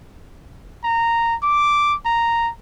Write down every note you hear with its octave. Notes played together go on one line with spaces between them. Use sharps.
A#5
D6
A#5